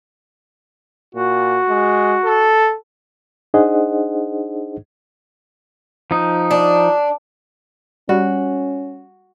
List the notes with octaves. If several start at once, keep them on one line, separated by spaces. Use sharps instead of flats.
A#2 F#4
G#3
A4
D4 D#4 G#4 C5 D#5 F#5
F3 D#4
D4
G3 C#4 F#4